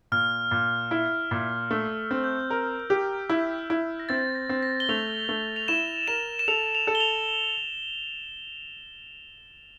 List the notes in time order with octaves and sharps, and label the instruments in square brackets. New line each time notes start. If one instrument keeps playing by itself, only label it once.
[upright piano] A#2 [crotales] F6
[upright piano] A#2
E4
A#2
[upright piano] A3 [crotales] E6
[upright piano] C4
[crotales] G6
[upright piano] A#4
G4
E4
E4
[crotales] A#6
[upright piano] C4 [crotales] A6
[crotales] A#6
[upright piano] C4
[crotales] A#6
G7
[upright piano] A3 [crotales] F7
[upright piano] A3
[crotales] F7
[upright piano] E4 [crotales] E7
[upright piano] A#4 [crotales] E7
[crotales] E7
[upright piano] A4 [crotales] F7
[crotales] F7
[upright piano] A4
[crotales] G7
F7